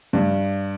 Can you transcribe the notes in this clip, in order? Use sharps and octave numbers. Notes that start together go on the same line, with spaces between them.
G2